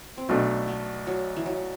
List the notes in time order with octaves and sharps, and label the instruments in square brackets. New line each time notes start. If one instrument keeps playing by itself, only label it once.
[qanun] C4
[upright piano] B1 B2 A3 D4 [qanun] B3
[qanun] B3
F#3
E3
F#3